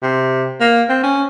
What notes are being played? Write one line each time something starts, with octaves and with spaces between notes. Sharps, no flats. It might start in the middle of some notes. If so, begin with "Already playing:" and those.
C3
A#3
C4
C#4